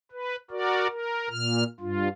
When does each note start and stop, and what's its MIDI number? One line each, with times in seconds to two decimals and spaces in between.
0.12 0.36 71
0.51 0.87 66
0.51 0.87 70
0.51 0.87 74
0.90 1.28 70
1.31 1.64 46
1.31 1.64 89
1.80 2.08 43
1.80 2.08 65